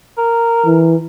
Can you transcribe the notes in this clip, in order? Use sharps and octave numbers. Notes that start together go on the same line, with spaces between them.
A#4
E3